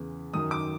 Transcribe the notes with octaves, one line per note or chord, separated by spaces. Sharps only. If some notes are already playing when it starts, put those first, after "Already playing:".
Already playing: E2 C#3 E3
F#2 D#3 D#6
D6